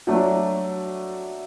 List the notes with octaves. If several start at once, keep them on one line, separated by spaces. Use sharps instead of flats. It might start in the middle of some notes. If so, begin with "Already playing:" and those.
F#3 A3 D4